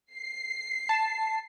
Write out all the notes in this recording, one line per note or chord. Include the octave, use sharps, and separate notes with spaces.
C7
A5